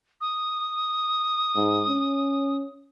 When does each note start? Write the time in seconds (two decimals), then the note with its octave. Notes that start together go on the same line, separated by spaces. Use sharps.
0.21 D#6
1.56 G#2
1.88 C#4